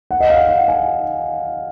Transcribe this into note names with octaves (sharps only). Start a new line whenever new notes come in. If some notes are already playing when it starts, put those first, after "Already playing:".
F#5
D#5
F5
F#5
G#5